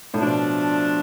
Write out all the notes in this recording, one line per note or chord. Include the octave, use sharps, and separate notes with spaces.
A2
B2 F3 A3 D4